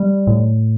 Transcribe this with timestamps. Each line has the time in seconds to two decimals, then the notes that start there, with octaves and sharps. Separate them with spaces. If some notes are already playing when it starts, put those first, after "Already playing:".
Already playing: G3
0.27 A2